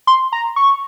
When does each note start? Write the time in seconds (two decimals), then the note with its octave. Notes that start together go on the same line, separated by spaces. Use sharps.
0.07 C6
0.33 A#5
0.56 C#6